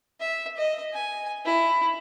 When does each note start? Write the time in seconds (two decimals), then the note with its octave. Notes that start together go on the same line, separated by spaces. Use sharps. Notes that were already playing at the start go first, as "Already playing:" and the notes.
0.20 E5
0.57 D#5
0.93 G#5
1.45 E4